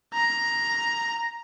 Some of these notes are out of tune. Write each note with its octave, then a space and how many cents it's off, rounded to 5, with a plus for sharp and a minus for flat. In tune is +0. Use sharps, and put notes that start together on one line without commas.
A#5 +5